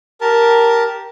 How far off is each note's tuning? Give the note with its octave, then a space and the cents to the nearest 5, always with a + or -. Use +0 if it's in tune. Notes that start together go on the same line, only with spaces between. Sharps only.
G4 -5 A#4 +5 A5 +0